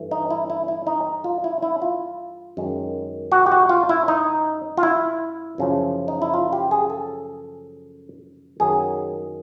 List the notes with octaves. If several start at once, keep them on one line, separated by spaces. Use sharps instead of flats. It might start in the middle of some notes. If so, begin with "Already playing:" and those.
Already playing: G2 E3 A3
D#4
E4
E4
E4
D#4
F4
E4
E4
F4
F#2 D#3 G#3
F#4
G4
F#4
F4
E4
D#4
F4
E4
F#2 C#3 F3
D#4
E4
F4
G4
G#4
A4
F#2 D#3 F#3 G#4